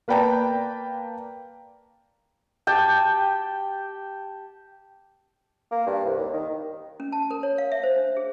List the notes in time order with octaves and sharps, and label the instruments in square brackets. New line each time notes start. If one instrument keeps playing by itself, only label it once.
[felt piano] A#3 B4 D5 G5 A5 A#5
[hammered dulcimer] G4 G5 A5
[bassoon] A#3
G2
C2
D#2
D#3
[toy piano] C#4
A5
A#4
C#5
F5
E5
C5
D4
G#4